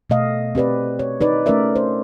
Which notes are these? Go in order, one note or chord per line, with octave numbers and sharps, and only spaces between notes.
B2 A3 D#5 F5
C4 G4 B4 D5
C#5
D#4 B4 D5
A3 C#4 A#4 D5 E5
C5